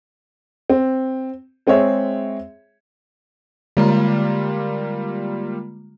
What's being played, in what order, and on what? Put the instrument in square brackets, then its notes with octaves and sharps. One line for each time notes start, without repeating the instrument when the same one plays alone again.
[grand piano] C4
G#3 C4 G#4 C#5 E5
[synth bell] D3 G#3 A#5 [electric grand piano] G3 A#3 F4